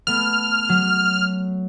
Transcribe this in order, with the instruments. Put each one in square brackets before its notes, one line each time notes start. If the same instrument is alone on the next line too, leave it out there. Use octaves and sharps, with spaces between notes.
[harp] A3 B3 [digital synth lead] F6
[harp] F#3